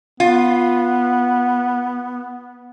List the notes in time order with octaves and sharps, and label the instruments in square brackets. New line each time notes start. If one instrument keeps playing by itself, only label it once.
[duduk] B3 [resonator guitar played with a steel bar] F4